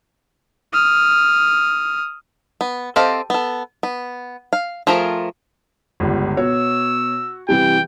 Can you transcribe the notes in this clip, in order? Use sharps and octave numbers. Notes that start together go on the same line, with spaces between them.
D#6 F6
B3
C4 G4 A4 D#5 F5
B3 A4
B3
F5
F3 A3 F4 G#4 A#4
G1 C#2 G3
B2 F#4 C#5 E6
C3 E3 G3 G5